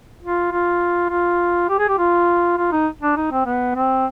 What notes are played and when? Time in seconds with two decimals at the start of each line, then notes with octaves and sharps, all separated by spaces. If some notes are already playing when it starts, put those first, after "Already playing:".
0.22 F4
0.52 F4
1.10 F4
1.69 G4
1.79 G#4
1.88 G4
1.98 F4
2.57 F4
2.72 D#4
3.01 D4
3.17 D#4
3.31 C4
3.46 B3
3.75 C4